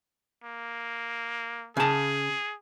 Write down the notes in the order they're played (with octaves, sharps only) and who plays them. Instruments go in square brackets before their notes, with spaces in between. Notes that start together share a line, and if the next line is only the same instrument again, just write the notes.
[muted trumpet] A#3
[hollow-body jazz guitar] C#3 A5 [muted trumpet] G#4